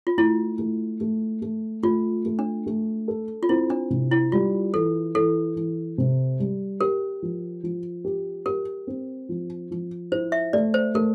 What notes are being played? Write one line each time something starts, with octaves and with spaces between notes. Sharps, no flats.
F4
A3 E4
A3
A3
A3
A3 F4
A3
D4
A3
A4
F4
C4 E4
D4
C3
E4
G3 F4
E3 A4
E3 A4
E3
C3
G3
G4 A#4
F3
F3
G4
G4 A#4
C4
F3
F3
E4 C5
E5
A3 D5
C5
A3 A#4